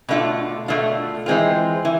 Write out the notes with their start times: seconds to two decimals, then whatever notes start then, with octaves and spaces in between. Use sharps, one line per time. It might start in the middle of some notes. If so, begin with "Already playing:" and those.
0.09 B2 A3 D4 F4
0.68 B2 A3 D4 F4
1.26 E3 G#3 C4 F4
1.85 E3